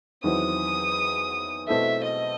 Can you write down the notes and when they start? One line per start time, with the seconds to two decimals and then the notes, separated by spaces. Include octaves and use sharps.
0.24 E2 D#3 F#3 C4 E4 D#6
1.68 B2 A3 C4 E4 A4 E5
2.04 D#5